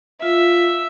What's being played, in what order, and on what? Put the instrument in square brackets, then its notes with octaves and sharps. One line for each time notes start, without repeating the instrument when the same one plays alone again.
[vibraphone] F4 F5 [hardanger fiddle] E5